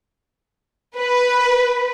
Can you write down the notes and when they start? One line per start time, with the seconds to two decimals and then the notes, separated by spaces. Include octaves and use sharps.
0.96 B4